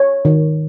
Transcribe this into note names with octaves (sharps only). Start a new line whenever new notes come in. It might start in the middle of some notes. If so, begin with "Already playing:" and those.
Already playing: C#5
D#3